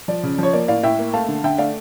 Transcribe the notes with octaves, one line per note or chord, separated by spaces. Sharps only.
F3 D5
C#3
F3 C#5
A#3 D5
A2 D5 F5
A2 E5 G5
A#3
A3 F5 A5
D3
D3 E5 G5
A3 D5 F5